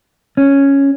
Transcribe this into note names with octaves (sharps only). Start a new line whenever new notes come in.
C#4